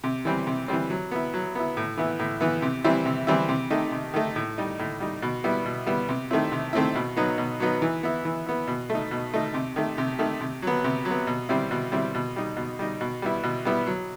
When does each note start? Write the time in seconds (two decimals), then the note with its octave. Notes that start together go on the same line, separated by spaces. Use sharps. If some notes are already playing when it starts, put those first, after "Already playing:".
0.04 C3
0.25 E3 G3 C4
0.47 C3
0.68 E3 G3 C4
0.90 F#3
1.11 B3 E4
1.34 F#3
1.55 B3 E4
1.77 A2
1.97 E3 B3 E4
2.19 A2
2.41 E3 B3 E4
2.62 C3
2.84 E3 G3 C4 E4
3.06 C3
3.27 E3 G3 C4 E4
3.49 C3
3.70 D#3 A3 D#4
3.92 C3
4.14 D#3 A3 D#4
4.36 A2
4.58 G3 D#4
4.79 A2
5.00 G3 D#4
5.22 B2
5.44 G3 B3 E4
5.65 B2
5.86 G3 B3 E4
6.09 C3
6.31 D#3 A3 C4 E4
6.52 C3
6.73 D#3 A3 C4 E4
6.95 B2
7.17 F#3 B3 D#4
7.38 B2
7.60 F#3 B3 D#4
7.82 E3
8.03 B3 E4
8.25 E3
8.46 B3 E4
8.67 B2
8.90 A3
8.95 D#4
9.11 B2
9.34 A3 D#4
9.54 C3
9.76 D#3 A3
9.98 C3
10.19 D#3 A3
10.41 C3
10.62 F#3 B3
10.84 C3
11.05 F#3
11.11 B3
11.27 B2
11.49 G3 C4 E4
11.71 B2
11.92 G3 C4 E4
12.15 B2
12.36 G3 D#4
12.57 B2
12.79 G3 D#4
13.01 B2
13.22 G3 B3 E4
13.43 B2
13.65 G3 B3 E4
13.87 F#3